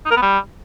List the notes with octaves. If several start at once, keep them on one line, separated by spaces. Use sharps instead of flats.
D#4
A#4
B3
G3